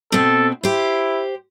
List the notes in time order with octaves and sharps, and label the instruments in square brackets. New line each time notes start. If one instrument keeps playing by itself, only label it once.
[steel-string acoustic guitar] B2 C4 [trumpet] A4
[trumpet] E4 [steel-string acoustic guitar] G4 C5